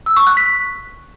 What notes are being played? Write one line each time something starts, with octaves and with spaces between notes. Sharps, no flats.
E6
C#6
F#6
B6